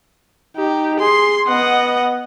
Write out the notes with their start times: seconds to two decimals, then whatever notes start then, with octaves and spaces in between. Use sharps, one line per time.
0.56 D#4 G4
1.00 G#4 C6
1.48 B3 D#5 F#5